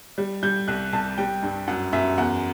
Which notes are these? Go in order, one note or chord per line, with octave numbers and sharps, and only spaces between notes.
G3
G3 G6
C2 F#6
C2 A5
G3 G5
G2
F#2 F#5
F#2 E5
E2 F#5